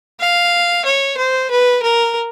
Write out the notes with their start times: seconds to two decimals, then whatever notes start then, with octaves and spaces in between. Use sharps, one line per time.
0.20 F5
0.85 C#5
1.17 C5
1.50 B4
1.82 A#4